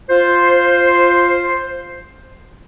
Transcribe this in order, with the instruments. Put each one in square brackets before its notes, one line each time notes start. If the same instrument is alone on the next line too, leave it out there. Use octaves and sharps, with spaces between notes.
[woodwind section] F4 C5